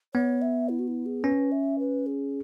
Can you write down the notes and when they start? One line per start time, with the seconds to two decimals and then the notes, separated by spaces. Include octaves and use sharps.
0.14 B3 C#5
0.42 E5
0.69 E4
0.79 F#4
0.88 E4
1.06 G#4
1.24 C#4 B4
1.52 E5
1.79 B4
2.06 G#4